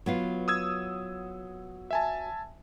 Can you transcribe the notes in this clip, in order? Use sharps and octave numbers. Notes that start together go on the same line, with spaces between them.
F#3 B3 F4
D#6 E6 G#6
E5 G#5 A5